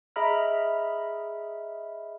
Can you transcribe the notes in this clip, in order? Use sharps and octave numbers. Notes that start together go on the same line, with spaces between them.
G#4 D#5 E5 A#5 B5 F6